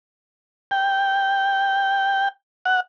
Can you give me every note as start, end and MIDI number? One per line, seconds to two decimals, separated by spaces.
0.71 2.28 79
2.65 2.80 78